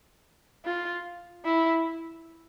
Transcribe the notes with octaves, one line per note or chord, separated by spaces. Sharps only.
F4
E4